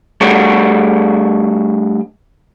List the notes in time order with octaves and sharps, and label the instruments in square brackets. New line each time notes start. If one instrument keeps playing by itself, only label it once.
[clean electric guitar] G3 A3 D4 F#4 G#4 C#5